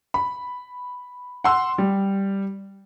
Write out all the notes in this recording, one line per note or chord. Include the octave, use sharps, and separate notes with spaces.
B5
F#5 C6 E6
G3